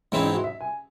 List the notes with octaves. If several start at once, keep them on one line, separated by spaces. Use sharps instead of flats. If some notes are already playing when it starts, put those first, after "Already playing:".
G#2 E3 C4 C#4 E4
D#4
F#4
E5
G#5